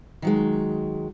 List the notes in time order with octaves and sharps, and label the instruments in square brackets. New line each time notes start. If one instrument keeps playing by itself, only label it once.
[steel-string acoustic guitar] D#3 F#3 G#3